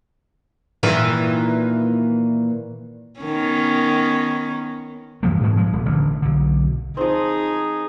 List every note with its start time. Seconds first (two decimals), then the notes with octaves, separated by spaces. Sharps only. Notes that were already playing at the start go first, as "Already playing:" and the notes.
0.83 A#2 D#3 E3
3.21 D#3 B3 C#4
5.23 F#2 E3 F3 A3
5.40 G#2 B2 G#3
5.57 G#2 F3 G#3
5.73 D#1
5.86 A1 D3
6.22 B1 D3
6.97 F3 C4 D#4 G#4